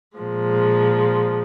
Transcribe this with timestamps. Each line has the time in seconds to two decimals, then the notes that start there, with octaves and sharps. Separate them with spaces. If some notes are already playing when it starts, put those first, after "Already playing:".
0.16 A#2 F3 G#3